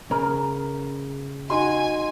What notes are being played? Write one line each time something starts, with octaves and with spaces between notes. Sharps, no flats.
C#3 A#4
D#4 F#4 G#5 C6